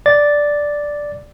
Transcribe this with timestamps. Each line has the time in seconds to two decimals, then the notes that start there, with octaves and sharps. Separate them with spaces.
0.06 D5 A6